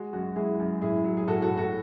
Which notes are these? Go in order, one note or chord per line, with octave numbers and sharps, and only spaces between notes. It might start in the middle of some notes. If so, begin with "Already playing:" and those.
Already playing: G#3 F#4
F#2 F#4
G#3 E4 G#4
F#2
A2 E4 G#4
F#3
G#4
A2 F#4 A4
F#4 A4
A2
F#4 A4